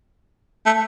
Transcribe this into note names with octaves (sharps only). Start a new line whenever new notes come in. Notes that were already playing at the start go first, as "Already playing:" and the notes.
A3